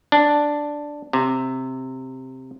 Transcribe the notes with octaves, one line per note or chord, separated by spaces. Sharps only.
D4
C3